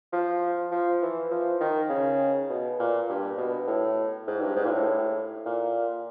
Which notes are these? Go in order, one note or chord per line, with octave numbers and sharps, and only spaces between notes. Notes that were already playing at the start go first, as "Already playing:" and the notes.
F3
F3
E3
F3
D#3
C#3
B2
A#2
G2
B2
A2
G#2
G2
G#2
A#2
A2
A#2